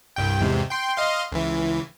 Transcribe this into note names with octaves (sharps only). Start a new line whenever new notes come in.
C2 G2 G5
E2 G#2 C3
G5 C6
D#5 F5 C6
C#2 E3